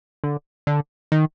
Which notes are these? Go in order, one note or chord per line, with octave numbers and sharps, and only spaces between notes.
D3
D3
D#3